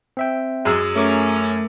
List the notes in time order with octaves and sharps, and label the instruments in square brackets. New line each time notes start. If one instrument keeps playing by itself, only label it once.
[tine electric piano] C4 E5 G5
[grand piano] F#2 G#4 E6 [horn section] G#3
[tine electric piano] A3 A#4 D6 [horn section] C#4